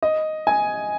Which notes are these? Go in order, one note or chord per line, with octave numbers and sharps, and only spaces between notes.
D#5
G#5